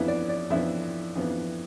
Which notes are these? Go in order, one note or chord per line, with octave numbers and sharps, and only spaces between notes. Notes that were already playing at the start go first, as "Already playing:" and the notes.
Already playing: F2 E3 B3 D4 E5
D5
D5
F2 E3 B3 D4 E5
F2 E3 B3 D4